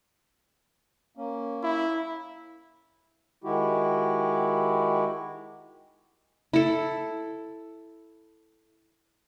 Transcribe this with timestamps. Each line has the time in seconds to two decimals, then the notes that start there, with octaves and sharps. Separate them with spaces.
1.17 A#3 C#4
1.63 E4
3.44 D#3 G#3 E4 F#4 G4
6.53 E4 A4